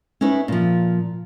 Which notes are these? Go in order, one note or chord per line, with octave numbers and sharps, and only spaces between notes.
C#4 D#4 E4 B4
A#2 F3